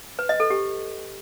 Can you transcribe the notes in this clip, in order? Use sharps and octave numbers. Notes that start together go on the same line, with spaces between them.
B4
D#5
A4
G4